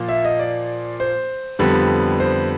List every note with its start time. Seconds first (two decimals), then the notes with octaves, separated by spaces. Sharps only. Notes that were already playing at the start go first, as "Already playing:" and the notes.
Already playing: A#2 F3 A#3
0.09 E5
0.25 D#5
0.39 D5
1.00 C5
1.59 F2 D3 G3 B3
2.20 C5